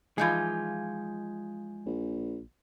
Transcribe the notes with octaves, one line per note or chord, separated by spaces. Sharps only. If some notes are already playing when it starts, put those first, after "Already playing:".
E3 F3 G#3 D#4 F4 G#5 G6 G#6
A#1